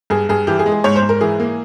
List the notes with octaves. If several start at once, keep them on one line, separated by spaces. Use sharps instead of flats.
G2 G#4
G2 G#4
E3 G4
G#4
G#3
G#4
G#2 C#5
C5
G#2
A#4
E3 G#4
A#3